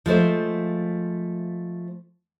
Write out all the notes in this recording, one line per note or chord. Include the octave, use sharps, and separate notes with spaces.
F3 G#3 A3 C5